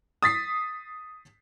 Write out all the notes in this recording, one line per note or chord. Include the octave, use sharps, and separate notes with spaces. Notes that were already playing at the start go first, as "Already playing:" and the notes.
D#6 A6 B6 C7